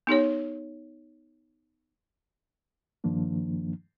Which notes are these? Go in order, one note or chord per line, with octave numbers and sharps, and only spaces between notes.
B3 D#4 G4 C#5
G2 D#3 F3 A#3 D4